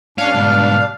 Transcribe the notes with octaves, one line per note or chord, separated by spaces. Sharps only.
G2 C#4 D4 F5
G#2 B2